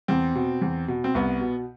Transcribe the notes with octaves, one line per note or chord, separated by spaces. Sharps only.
E2 C4
B2
E2
B2
C4
C2 B3
B2